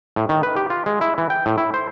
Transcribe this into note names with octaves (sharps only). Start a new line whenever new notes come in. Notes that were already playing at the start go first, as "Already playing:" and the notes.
A2
D#3
B4
G4
F4
G#3
E4
E3
G5
A2
E4
C5